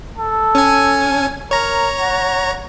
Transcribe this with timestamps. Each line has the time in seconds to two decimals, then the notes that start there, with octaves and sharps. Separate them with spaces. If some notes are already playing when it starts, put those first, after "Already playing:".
0.18 A4
0.55 C#4 G#5
1.51 A#4 C#5 A#5
2.00 F#5